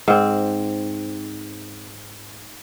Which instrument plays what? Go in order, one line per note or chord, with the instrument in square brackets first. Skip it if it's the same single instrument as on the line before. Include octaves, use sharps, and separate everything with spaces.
[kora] G#2 C4